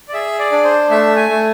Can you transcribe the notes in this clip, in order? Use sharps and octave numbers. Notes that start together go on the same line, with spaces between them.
D5
G#4 E5
D5
D4
C5
A3 E5
G#5
A3